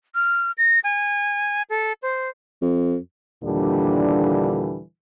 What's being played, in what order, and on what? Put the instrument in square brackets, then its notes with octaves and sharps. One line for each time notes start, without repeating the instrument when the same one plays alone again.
[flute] F6
A#6
G#5
A4
C5
[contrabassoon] F2
[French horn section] D#2 A#2 D3 E3 G3 D4